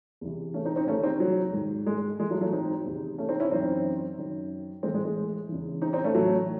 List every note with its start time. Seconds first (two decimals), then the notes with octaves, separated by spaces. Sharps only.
0.21 E2 C3 E3
0.54 A3 C#4
0.65 C4 D#4
0.76 C4 D#4
0.87 E2 C3 D#3 A3 C#4
1.03 C4 D#4
1.20 F#3
1.53 G#2 D#3
1.87 G#3
2.19 G#2 E3 G#3
2.30 F#3 A3
2.41 F#3 A3
2.53 C4 D#4
2.85 E2 C3 D#3
3.18 A3 C#4
3.29 C4 D#4
3.40 C#4 E4
3.51 F#2 E3 C4 D#4
4.18 F#2 D#3
4.83 A2 E3 G#3 C4
4.94 G#3
5.05 G#3
5.49 E2 C#3 E3
5.82 C4 D#4
5.93 C4 D#4
6.04 A3 C#4
6.15 A2 E3 F#3 A3